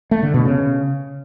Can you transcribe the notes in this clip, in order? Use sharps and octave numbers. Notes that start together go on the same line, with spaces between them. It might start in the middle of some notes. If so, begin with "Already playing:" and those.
A3
D3
B2
C#3